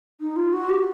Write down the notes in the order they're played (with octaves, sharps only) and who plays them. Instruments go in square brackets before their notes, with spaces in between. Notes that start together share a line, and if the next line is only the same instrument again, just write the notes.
[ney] D#4
F4
F#4
G4